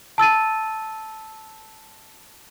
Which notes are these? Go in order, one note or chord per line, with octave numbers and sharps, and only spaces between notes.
A5 E6 A6 D#7